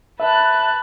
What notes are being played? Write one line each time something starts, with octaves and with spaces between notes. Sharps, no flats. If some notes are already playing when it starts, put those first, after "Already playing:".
B4 E5 A5 F#6